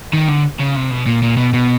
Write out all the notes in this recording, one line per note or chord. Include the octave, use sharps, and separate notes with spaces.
D#3
D3
C#3
C3
B2
A#2
A#2
B2
B2